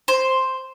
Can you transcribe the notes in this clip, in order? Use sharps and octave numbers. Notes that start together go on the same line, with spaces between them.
C5